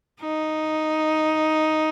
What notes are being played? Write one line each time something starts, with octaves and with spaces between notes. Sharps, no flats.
D#4